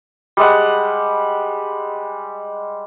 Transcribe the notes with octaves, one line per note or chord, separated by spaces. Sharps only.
G3 G#3 F#5